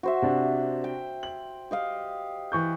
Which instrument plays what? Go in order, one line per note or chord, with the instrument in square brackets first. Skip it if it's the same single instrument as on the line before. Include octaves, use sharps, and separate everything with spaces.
[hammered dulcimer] F#4 C5 E5
[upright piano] C3 D4
[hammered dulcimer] G5
[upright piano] F#7
[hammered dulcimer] G4 D#5 F5
[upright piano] E3 C#6 G6